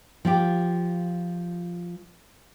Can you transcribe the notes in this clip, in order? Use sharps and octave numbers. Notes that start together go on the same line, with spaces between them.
F3 F4 G4